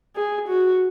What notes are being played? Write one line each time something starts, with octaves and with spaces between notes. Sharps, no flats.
G#4
F#4